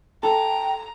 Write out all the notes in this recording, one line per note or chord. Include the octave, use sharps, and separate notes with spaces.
A4 G5 A#5